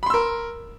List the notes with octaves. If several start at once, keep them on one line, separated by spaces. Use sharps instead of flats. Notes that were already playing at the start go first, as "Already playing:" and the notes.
A#4 B5 C6 E6